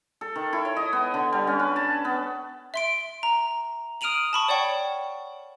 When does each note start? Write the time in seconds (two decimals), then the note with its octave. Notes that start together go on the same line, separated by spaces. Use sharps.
0.21 A4
0.36 D#3
0.53 E4
0.65 C#5
0.76 D#5
0.93 B3
1.14 D3
1.33 G3
1.47 C#4
1.59 B4
1.76 A5
2.05 B3
2.74 E5 C6 D7
3.23 A#5
4.01 D#6 F6 D7 D#7 F7 F#7
4.33 A5 B5 C#6
4.48 C#5 D5 F#5 G5 C#6